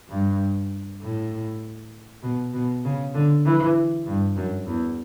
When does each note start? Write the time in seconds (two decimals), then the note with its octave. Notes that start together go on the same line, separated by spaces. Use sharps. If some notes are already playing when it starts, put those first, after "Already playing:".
0.09 G2
1.01 A2
2.22 B2
2.53 B2
2.84 C#3
3.14 D3
3.45 E3
4.06 G2
4.36 F#2
4.66 E2